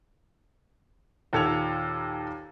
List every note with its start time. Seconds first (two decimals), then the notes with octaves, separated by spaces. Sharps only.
1.33 D#2 A#2 A4 G#6 C#7 F7